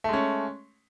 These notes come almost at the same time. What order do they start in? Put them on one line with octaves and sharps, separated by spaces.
A3 G#3 C#4